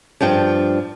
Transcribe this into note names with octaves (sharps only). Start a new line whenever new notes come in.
G2 F3 D4 G5